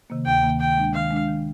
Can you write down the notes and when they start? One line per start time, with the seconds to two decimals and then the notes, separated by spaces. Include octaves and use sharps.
0.10 C3 D#3 A#3
0.26 D2 G5
0.43 C3 D#3 A#3
0.60 D#3 G5
0.77 G#3 D4
0.94 D#3 F5
1.11 G#3 D4
1.28 D#3